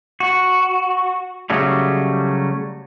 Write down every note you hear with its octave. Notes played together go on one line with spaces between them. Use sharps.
F#4
C#3 F#3 G3 A3